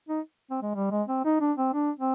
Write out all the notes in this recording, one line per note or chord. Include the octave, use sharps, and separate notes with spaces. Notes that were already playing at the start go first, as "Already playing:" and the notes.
D#4
C4
G#3
G3
G#3
C4
D#4
D4
C4
D4
C4